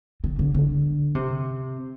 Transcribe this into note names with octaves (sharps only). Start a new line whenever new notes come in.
D3
D3
D3
C3